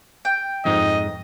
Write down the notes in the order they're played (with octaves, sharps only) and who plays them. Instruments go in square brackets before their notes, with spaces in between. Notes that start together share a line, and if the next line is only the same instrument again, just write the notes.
[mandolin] G5
[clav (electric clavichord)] F2 G#2 D#4 [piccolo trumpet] D#5